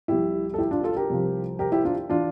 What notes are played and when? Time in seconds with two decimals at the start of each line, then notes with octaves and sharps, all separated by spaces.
0.08 C2 C3 F3 E4 G4
0.54 A4
0.58 E4 G4
0.71 D4 F4
0.83 F4 A4
0.96 G4 A#4
1.10 C2 C3 F3
1.59 G4 A#4
1.72 E4 G4
1.85 D4 F4
2.10 E3 D4 F4